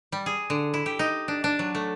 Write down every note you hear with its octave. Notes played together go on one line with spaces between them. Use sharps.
G3
G#4
D3
E4
G4
D#4
D4
D4
F#3
A3